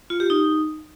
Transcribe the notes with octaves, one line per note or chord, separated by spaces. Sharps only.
F4
G4
D#4